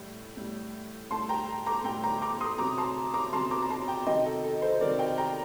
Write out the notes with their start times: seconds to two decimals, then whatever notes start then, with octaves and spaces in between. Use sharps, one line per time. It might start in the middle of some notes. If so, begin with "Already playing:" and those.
Already playing: A2 G3
0.37 A2 G3
1.10 A2 G3 A5 C6
1.29 G5 A#5
1.66 A#5 D6
1.84 A2 G3 G5 A#5
2.04 G5 A#5
2.22 A#5 D6
2.40 C6 D#6
2.58 C3 F#3 A#5 D6
2.78 A5 C6
3.14 A#5 D6
3.33 C3 F#3 A5 C6
3.51 A#5 D6
3.62 A#5
3.70 A5 C6
3.88 G5 A#5
4.07 C3 D#3 F#3 D#5 G5
4.26 A4
4.44 A4
4.62 A4 C5
4.81 C3 D#3 F#3 A#4 D5
4.99 D#5 G5
5.18 G5 A#5